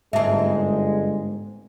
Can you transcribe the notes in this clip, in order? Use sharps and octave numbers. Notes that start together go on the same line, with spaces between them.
G1 G#2 G#3 C4 E5 A5